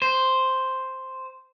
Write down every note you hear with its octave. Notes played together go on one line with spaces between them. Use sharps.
C5